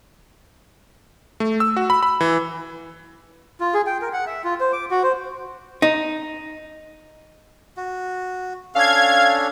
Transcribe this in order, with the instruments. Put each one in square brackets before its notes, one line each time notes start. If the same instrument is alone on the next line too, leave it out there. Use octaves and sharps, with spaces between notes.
[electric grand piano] A3
E6
F#4
B5
B5
E3
[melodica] F4
G#4
G5
A#4
F#5
E5
F4
C5
D6
F#4
C5
[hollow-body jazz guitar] D#4
[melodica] F#4
[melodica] C#4 D4 A4 [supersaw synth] F5 G#6